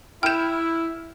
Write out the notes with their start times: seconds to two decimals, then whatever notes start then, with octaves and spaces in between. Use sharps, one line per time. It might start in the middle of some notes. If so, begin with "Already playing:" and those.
0.23 E4 G5 F6 G6 E7